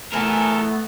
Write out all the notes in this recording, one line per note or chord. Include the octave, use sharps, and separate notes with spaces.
E3 A3 B3 A4 A#4